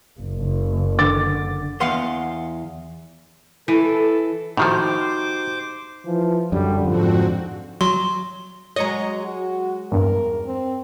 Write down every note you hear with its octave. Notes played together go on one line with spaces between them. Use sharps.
F#1
D3 D6 A6
E2 F5 F#5 C6
E3 A4
A2 D#3 F3 D#4 F#4 G4 C5 D6
E3 F3
F#2 D3 G3
F2 G#2 F3 C4 F#4
F#3 C6
F#3 G#3 C#5 D#5 A#5
F#4
E2 G2 A#4
C4